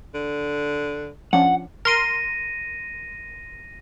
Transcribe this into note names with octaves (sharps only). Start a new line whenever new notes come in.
D3
F3 C#4 D4 F#5
A#4 C6 A#6 D#7